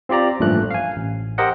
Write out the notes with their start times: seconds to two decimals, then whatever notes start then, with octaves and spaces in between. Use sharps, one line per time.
0.09 C4 F4 G4 D5 A#5
0.40 A1 G2 A#2 F3 A3 F#6
0.71 F5 G#5
0.95 A1
1.38 G4 A#4 C5 D#5 F#5